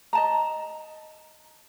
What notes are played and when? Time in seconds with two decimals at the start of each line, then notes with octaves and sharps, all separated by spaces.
0.13 D#5 A5 A#5